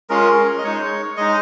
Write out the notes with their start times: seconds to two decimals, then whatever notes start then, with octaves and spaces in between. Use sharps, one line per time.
0.09 G#3 C#4 F4 A#4
0.58 D#5
0.63 G#3 D#4 C#5
1.17 G#3 D#4 D#5